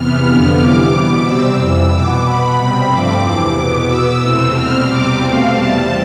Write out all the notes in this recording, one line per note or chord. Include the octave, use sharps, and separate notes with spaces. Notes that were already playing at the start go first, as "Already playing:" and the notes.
Already playing: E2 C3 E3 B3 F6
F2 D3 F3 B3
C3 E3 G3 D6
B2 B3
C3 G3 C4 E6
F2 E3 G3
B2 B3 D6
B2 B3 B5
C3 G3 C4
G2 F3 A3 C4 D6
E2 C3 E3
E2 B2 B3
B2 B3 E6
E2 C3 E3 A3 C4
B2 G3 C4 F6
E2 C3 G3 C4 D6
B2 A3 C4 F5
E2 C3 G3 A5